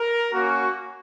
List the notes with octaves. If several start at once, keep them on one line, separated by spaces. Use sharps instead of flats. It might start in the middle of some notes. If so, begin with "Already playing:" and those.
Already playing: A#4
A#3 C#4 F#4